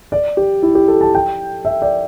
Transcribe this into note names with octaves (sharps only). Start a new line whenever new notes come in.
D5
G4
E4
G4
A4
A5
G5
E5
D5